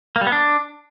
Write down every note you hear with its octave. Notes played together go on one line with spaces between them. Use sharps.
A#3
G3
B3
D4